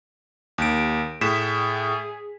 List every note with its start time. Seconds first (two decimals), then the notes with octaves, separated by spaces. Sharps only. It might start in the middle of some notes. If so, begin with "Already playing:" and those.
0.58 D#2 D7
1.21 A2 G#4 B6 E7